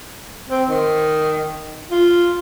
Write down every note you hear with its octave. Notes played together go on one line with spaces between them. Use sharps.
C4
D#3
F4